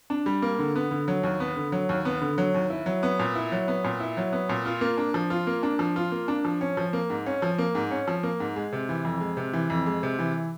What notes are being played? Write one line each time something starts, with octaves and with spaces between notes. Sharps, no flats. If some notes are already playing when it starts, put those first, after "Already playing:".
D4
G3
A#3
D3
B3
D3
F#3
D#2
B3
D3
F#3
D#2
B3
D3
F#3
D#2
E4
F#3
B3
A#2
E4
F#3
B3
A#2
E4
F#3
B3
A#2
F4
A#3
D4
F3
F4
A#3
D4
F3
F4
A#3
D4
F3
C#4
F3
A#3
G#2
C#4
F3
A#3
G#2
C#4
F3
A#3
G#2
G#3
C3
E3
F2
G#3
C3
E3
F2
G#3
C3
E3